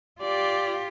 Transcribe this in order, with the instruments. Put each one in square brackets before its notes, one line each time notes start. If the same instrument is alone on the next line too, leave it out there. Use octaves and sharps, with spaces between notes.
[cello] F4 G4 [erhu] D5